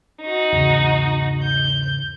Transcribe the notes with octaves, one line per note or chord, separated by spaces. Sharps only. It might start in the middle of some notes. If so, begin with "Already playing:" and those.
D#4 F#4
E2 G#2 C#3
G6